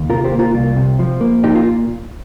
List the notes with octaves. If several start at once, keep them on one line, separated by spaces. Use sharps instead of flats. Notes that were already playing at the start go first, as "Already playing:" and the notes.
Already playing: D#2
C3 F4 A#4
G4 C5
A#3
F4 A#4
C2 F4
C3
F3
A#3
A#2 D#4 G4
F4